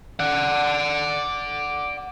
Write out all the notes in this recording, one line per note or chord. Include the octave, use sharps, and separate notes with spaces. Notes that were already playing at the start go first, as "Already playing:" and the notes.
D5 F#5